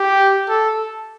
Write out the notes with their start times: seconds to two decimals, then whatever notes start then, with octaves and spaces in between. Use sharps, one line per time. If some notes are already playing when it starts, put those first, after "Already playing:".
Already playing: G4
0.49 A4